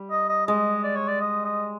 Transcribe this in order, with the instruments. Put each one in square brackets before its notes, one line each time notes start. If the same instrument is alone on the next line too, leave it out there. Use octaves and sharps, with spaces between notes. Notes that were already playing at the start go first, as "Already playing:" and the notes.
Already playing: [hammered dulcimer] G3
[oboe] D#5
D#5
[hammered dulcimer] G#3 [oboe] D#5
[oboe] D5
C#5
D5
D#5
D#5